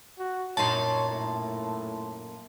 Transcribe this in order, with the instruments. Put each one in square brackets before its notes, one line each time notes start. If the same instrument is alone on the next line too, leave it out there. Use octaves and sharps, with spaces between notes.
[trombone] F#4
[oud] F#2 A#2 D#4 [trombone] C#5 [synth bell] A5 C6
[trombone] A2